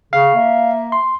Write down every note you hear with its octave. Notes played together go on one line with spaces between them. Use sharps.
C#3 F5
A#3 E5
C6